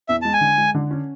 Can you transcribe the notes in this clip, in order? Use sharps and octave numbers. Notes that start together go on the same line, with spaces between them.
E2 E5
G#3 A5
G#5
D3
G#3
D3
C#4